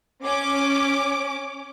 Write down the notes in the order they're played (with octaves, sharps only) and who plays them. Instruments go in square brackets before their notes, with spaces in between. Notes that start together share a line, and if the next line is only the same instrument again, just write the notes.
[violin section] C#4 D6